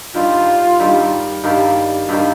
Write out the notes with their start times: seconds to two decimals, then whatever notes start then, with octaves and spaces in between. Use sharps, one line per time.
0.14 G2 D#3 G3 A#3 F4
0.79 G2 D#3 G3 A#3
1.44 G2 D#3 G3 A#3
2.09 G2 D#3 G3 A#3